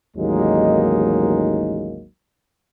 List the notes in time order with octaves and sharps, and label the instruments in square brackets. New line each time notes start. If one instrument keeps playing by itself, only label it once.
[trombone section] A1 D#2 F#3 G#3 A#3 D#4